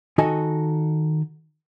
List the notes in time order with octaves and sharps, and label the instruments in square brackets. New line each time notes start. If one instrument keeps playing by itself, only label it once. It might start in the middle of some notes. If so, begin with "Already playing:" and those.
[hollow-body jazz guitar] D#3 D#4 F#4 A4 D#5 G#5